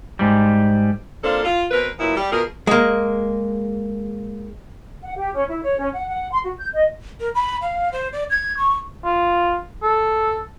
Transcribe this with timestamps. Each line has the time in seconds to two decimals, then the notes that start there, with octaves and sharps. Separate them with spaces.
0.19 G#2 G3
1.24 A#3 C4 D4 F4 A4
1.44 F4
1.71 B2 C4 A#4 B4
1.98 A#2 F#3 B3 E4
2.15 G3
2.31 B2 F4 G#4 A#4
2.67 G#3 A#3
5.02 F#5
5.16 G4
5.34 C#4
5.48 E4
5.63 C#5
5.78 C#4
5.93 F#5
6.07 F#5
6.31 C6
6.43 F#4
6.58 G6
6.74 D#5
7.20 A#4
7.35 B5
7.62 F5
7.92 C5
8.13 D5
8.30 G#6
8.57 C#6
9.05 F4
9.83 A4